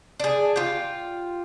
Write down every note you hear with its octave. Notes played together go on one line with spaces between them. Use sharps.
D4 G#4
F4 G4